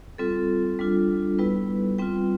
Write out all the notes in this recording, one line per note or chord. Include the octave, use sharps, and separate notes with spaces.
G3 C4 F4 A4
G3 D4 F4
G3 B3 E4 B4
G3 C4 F4 G5